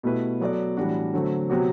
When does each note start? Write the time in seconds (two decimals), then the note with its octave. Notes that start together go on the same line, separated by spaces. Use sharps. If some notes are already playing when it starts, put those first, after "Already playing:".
0.03 B2 A3 E4 G4 B4
0.40 F#3 B3 F#4 A4 D5
0.77 A2 E3 G3 D4 F#4
1.14 D3 F#3 A3 C4
1.50 C3 F#3 B3 F#4